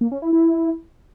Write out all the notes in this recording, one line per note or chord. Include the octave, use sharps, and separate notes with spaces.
A#3
C#4
E4
E4